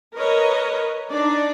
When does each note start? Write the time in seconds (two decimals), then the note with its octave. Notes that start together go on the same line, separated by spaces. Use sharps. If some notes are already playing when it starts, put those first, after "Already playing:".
0.14 A#4 B4 C#5 D#5
1.10 D4 D#4 D5